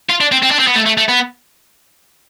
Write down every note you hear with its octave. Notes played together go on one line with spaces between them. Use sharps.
F4
D4
C4
C4
D4
C4
B3
A3
A3
A3
B3